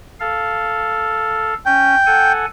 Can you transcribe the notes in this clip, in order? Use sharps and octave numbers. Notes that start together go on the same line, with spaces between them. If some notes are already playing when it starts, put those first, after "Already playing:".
A4 F5
C#4 G5
A4 F#5 G#5